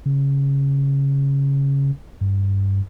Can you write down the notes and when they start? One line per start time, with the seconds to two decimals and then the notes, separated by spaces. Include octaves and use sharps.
0.06 C#3
2.21 G2